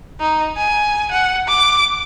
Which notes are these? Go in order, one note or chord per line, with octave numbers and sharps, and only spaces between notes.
D#4
G#5
F#5
D6